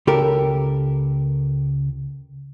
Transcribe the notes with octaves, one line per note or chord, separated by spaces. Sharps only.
C#2 G4 A4 A#4